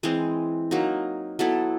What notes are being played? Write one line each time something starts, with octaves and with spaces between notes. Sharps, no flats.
E3 G#3 C4
F#3 A#3 D#4
F#3 B3 E4 A4